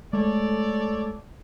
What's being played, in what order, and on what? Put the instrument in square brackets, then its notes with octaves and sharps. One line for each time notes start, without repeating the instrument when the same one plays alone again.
[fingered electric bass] G#3 A3 [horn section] A4 C#5 D5